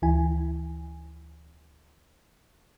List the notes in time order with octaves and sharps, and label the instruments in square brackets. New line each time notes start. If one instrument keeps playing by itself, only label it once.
[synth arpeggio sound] D2 E3 E4 G#5